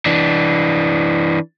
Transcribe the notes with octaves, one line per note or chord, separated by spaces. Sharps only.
E3 D4